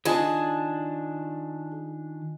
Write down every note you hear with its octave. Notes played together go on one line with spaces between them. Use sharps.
D#3 D4 F4 G#4 D#5 G#5 A5